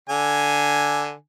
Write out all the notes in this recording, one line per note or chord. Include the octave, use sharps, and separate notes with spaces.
D3 G#5